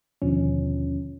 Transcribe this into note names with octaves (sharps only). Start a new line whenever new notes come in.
D#2 B2 D3 F3 C#4